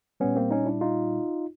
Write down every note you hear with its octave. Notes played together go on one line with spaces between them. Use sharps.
A#2 G3 B3 C#4
A#3 C4
C#4 D#4
D4 E4
D#4 F4